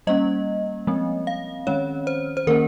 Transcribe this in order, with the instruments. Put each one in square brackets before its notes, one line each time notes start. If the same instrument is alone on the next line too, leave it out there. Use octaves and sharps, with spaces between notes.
[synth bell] G3 A#3 C#4 D#5
F3 G#3 C4
F5
D#3 G#3 C#4 C#5
C5
C5
D#3 A#3 C#4 A#4